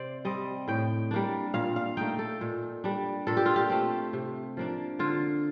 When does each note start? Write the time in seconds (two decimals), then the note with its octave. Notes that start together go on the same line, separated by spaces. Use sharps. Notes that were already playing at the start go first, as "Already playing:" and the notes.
Already playing: C3 C5 D5
0.25 G3 C4 D#5
0.68 A2 G5
1.11 G3 A#3 D4
1.54 A#2 F5
1.76 F5
1.97 A3 D#4 G5
2.19 A4
2.41 A#2
2.84 G3 D4
3.27 A#2 A4
3.37 G4
3.46 F4
3.56 G4
3.70 A3 C4
4.13 C3
4.57 F3 A#3 D4
4.99 D3 F4